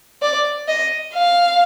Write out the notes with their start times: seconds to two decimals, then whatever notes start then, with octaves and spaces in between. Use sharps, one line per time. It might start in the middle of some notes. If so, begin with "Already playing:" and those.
0.22 D5
0.68 D#5
1.15 F5